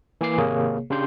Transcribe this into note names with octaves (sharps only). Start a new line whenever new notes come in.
E3 A#3 G#5 D6 C7
G#1 C3 A#3 G#4 C#5
C#3 D4 G4 C6 G6